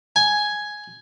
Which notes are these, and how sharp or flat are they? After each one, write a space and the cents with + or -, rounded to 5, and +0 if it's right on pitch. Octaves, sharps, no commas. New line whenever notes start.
G#5 +5